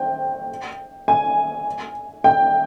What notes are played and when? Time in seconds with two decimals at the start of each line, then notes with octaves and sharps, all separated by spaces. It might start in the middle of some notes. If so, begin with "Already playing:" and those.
Already playing: C5 G5
1.08 G#5
2.24 G5